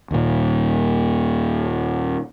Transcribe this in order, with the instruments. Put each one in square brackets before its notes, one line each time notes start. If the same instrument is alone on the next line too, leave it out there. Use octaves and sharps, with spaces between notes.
[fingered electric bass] D#2 A#2